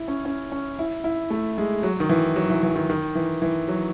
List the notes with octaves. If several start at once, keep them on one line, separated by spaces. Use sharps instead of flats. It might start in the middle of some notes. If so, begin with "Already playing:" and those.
Already playing: E4
C#4
C#4
C#4
E4
E4
A3
G#3
F#3
D#3
E3
F#3
E3
E3
D#3
D#3
E3
E3
F#3